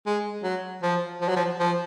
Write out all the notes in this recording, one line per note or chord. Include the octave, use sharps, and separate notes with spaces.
G#3
F#3
F3
F3
F#3
F3
F3